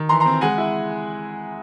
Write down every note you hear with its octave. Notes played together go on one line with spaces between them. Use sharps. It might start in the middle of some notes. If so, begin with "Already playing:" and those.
Already playing: D#3
E3 A#5 C6
A#5 C6
C4
G#3 F#5 G#5
E4